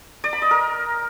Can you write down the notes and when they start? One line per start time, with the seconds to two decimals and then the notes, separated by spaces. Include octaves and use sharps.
0.24 D5
0.33 B5
0.42 D#5
0.51 A#4